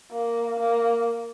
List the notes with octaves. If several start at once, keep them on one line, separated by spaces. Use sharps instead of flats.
A#3
A#3